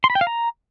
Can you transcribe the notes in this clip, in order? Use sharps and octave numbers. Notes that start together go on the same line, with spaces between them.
C6
B5
G5
F5
A#5